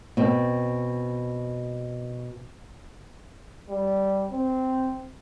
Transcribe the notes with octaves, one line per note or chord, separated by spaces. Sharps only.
B2 C4
G3
C4